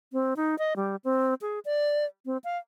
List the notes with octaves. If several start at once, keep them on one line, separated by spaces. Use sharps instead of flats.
C4
D#4
D#5
G3
C4
G#4
D5
C4
F5